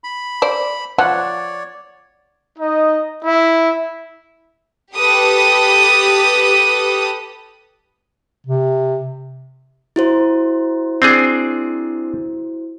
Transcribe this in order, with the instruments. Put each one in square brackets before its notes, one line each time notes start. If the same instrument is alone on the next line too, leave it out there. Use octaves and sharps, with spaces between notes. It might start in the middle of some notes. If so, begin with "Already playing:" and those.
[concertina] B5
[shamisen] C5 D5
[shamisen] F3 [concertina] C#5 D5 [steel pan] F#5
[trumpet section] D#4 D#5
E4 E5
[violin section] G4 A4 B4 D#6
[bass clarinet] C3
[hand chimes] E4 F#4 C5
[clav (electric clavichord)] C4 D4 G#4